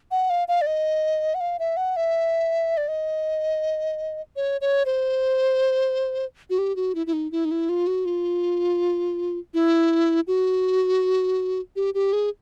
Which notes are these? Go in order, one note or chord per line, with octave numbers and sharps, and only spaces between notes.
F#5
F5
F5
D5
D#5
F#5
F5
E5
F#5
E5
D5
D#5
C#5
C#5
C5
F#4
G4
F#4
E4
E4
D#4
E4
D#4
E4
F4
F#4
F4
E4
F#4
G4
G4
G#4